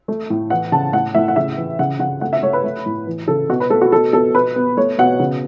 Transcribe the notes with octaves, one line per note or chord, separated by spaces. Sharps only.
A3
A2
E3 F#5
C#3 A5
A2 F#5
A2 E5
F#5
C#3 E5
E3
C#3 F#5
C#3 F#5
A3 F#5
E5
A3 C#5
B4
A3
A2
E3
C#3 A4
B2 F#4
B4
A3 A4
F#4
B2 A4
B2 A4
B2 B4
B3
A3 C#5
B2 F#5
C#3